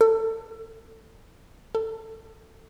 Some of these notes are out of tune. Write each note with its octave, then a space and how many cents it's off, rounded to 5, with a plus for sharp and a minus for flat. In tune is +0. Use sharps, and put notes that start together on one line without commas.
A4 +25
A4 +20